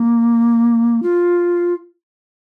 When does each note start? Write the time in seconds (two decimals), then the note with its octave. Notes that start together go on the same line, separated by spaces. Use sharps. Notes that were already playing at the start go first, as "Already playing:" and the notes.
Already playing: A#3
1.03 F4